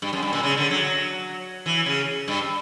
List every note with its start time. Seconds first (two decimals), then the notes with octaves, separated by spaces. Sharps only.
0.02 G2
0.13 F#2
0.23 G2
0.33 A#2
0.43 C#3
0.57 D3
0.71 F#3
1.66 E3
1.86 C#3
2.28 G2